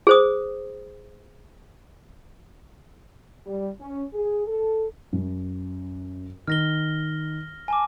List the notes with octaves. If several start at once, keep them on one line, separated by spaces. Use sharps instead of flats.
G#4 C5 D#6
G3
C#4
G#4
A4
F#2
D#3 F6 A#6 G7
G#5 A5 D6